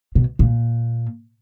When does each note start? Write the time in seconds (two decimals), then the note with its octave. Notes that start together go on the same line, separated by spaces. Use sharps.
0.15 B2
0.39 A#2